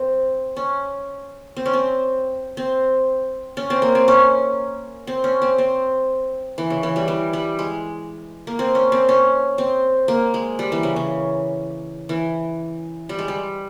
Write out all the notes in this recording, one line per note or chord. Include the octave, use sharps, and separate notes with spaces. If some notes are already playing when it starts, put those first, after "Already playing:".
Already playing: C4
C#4
C4
C#4
C4
C4
C#4
C4
A#3
C4
C#4
C4
C#4
C4
C4
E3
C#3
E3
G3
E3
G3
G#3
A#3
C4
C#4
C4
C#4
C4
A#3
G#3
G3
E3
C#3
C#3
E3
G3
G#3
G3